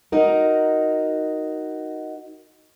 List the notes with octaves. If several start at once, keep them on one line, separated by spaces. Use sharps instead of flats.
D#4 F#4 A#4